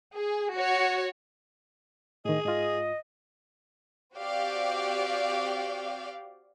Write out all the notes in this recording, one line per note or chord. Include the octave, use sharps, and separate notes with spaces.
G#4
F#4 C#5
A2 D#3 G#4 D#5
G#2 F4 D#5
C4 F#4 G4 D5 F5 G5